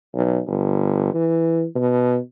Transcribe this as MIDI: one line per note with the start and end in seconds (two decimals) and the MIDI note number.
0.14 0.39 35
0.47 1.12 31
1.14 1.65 52
1.75 2.18 47